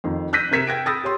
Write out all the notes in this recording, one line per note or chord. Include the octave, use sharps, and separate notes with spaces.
F2 D#3
E6 F#6 G6 A#6 B6 D#7
C3 A#4 G#6 B6 C#7 E7
G5 G#6 A#6 D7
B5 D#6 E6 G6 A6 A#6
G4 C#5 C6